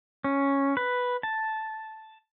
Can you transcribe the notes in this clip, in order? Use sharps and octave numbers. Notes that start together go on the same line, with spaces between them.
C#4
B4
A5